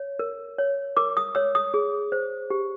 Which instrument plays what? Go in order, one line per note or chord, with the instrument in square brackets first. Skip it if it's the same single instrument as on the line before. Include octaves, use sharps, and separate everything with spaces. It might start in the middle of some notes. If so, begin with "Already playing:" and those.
Already playing: [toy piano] C#5
A#4
C#5
A#4 D6
D#6
C#5 E6
D#6
G#4
C5
G4